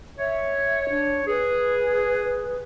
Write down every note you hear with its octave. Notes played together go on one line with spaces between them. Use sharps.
C#5 E5
D4
G#4 B4